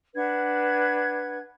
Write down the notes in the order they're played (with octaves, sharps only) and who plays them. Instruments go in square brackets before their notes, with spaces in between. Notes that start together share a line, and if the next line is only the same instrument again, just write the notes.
[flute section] D4 B4 F#5 G#6